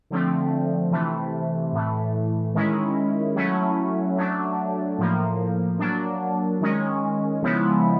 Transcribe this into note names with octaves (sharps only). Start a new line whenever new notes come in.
D3 F3 A3 C4
C3 E3 A3
A2 E3 A3
D#3 G#3 C#4 E4
F#3 A3 C#4 E4
F#3 A3 D4
A2 F3 A#3
F#3 A#3 D4
D#3 G#3 C#4
C#3 F3 G#3 B3 E4